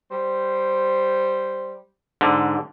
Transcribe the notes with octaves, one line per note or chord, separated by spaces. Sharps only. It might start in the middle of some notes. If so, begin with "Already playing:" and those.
G3 C5
G#2 D3